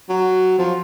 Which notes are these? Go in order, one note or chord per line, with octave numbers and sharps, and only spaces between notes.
F#3
F3